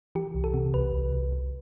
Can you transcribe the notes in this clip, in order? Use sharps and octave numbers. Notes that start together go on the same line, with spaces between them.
E3 G4
C2
A4
C3
C2 B4
C2
C2
C2